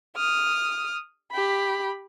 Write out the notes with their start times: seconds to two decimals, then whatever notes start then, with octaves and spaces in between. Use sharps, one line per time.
0.16 D#6 F6
1.31 G4 B5